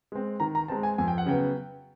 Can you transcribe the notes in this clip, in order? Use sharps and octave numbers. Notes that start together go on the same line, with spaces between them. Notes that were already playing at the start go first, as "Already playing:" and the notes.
G#3 C4
D#3 A#5
A#5
G#3 C4 A5
G#5
F2 G#5
G5
F#5
C#3 F#3 B3 G5